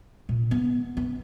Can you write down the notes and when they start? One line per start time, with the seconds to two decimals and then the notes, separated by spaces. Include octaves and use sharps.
0.29 A#2
0.51 B3
0.97 B3